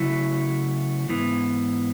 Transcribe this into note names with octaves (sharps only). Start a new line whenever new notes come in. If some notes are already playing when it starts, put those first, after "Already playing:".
Already playing: C#3 F#3 A3 E4
G#2 E3 B3